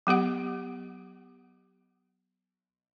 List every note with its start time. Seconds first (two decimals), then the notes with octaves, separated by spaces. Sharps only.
0.07 F#3 B3 G4 F#5